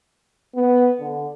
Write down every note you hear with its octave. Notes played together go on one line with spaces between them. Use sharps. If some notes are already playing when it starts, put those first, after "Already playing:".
B3
D3